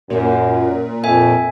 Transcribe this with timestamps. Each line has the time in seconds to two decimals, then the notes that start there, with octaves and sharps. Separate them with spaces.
0.10 F#2 A#2
1.04 F2 E5 G#5